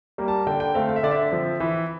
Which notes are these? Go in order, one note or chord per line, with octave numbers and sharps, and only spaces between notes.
G3 A#3
A5
D3 G5
G5
A3 C4 F5
F5
E5
D3 D5
E5
F3 C4
E3